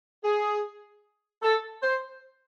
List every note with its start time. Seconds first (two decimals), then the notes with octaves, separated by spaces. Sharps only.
0.24 G#4
1.42 A4
1.82 C5